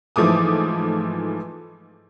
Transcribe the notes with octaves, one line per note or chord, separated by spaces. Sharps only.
G#2 E3 F3 A3 D6 D#6